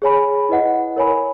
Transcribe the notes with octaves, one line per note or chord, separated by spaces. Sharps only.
G#4 C#5 G#5 B5
E4 B4 D#5 F#5
A#4 C#5 G#5 B5